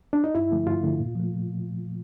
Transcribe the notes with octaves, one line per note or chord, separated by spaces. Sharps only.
D4
D#4
G2 E4
D3 F3 A3
G2 F4
D3 F3 A3
A#2
F3 A3